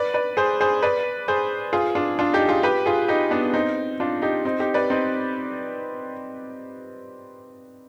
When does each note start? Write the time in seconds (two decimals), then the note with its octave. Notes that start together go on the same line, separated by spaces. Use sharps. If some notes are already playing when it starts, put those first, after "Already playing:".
Already playing: B4 D5
0.14 B4 D5
0.37 G#4 C5
0.61 G#4 C5
0.83 B4 D5
1.28 G#4 C5
1.73 F4 G#4
1.95 D4 F4
2.19 D4 F4
2.33 D#4 G4
2.48 F4 G#4
2.63 G4 B4
2.86 F4 G#4
3.08 D#4 G4
3.31 B3 D4
3.54 C4 D#4
4.00 D4 F4
4.22 D#4 G4
4.45 C4 D#4
4.60 D#4 G4
4.74 B4 D5
4.90 C4 D#4